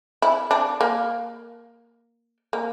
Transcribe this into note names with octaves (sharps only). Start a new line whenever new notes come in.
E4
D4
A#3
A#3